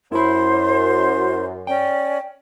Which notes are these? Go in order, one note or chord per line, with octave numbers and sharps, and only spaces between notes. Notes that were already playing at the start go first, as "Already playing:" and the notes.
F#2 E4 C5 B5 C6
C#4 D5 G5